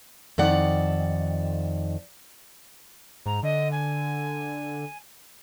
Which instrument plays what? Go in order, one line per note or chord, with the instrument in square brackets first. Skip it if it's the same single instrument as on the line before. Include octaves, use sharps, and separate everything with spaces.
[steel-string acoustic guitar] F2 D#3 D5 F#5
[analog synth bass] G#2 [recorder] A#5
[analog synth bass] D3 [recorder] D#5
[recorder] G#5